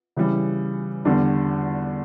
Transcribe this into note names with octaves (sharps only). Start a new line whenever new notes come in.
C#3 E3 G3
E2 D3 G3 D4